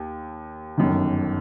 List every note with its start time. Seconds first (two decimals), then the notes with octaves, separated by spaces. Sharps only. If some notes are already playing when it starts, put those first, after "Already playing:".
Already playing: D#2
0.78 G1 F#2 D#3